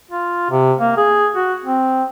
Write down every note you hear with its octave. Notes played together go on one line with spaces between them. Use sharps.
F4
C3
A#3
G#4
F#4
C4